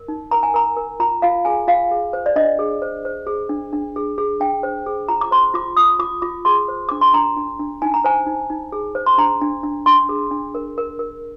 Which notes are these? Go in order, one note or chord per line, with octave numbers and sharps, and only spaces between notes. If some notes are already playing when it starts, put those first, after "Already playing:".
Already playing: A#4
D#4
A#4 A#5
G#5
A#4 A#5
A#4
F4 A#5
F4 F5
G#4 G#5
F4 F5
G#4
C5
D5
D4 D#5
G#4
C5
C5
G#4
D4
D4
G#4
G#4
D4 G5
C5
G#4
F4 A#5
D6
C5 C6
F4 D6
F4 D#6
F4 D6
F4 D6
G#4 C6
C5
D4 D6
C6
D4 A#5
D4
D4
D#4 G#5
A#5
C5 G#5
D#4
D#4
G#4
C5
C6
D4 A#5
D4
D4
D4 C6
G#4
D4
A#4
A#4
A#4